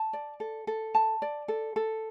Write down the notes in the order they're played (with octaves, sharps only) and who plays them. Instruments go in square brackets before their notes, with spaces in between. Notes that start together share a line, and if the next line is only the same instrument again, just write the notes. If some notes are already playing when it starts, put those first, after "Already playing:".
Already playing: [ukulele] A5
D5
A4
A4
A5
D5
A4
A4